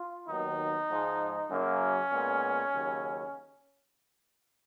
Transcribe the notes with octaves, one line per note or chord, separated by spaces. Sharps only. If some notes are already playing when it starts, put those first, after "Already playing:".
Already playing: F4
D#2 D#3 F#3 B3 D#4
G#2 F3 G#3
F#2 C#3 F#3 A#3 C#4
A#2 G#3 B3
D#2 C#3 F#3